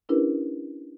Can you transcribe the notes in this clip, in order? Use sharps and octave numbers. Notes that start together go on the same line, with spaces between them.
C#4 D4 E4 G4 A#4 B4